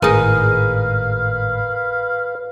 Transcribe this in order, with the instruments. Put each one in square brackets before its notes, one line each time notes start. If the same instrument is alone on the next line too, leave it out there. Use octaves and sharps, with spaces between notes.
[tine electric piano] G#1 A2 A#4 [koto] G#3 D#4 [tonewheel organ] B4 [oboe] F5